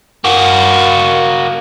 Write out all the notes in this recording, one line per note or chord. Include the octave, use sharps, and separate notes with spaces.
A#3 F#4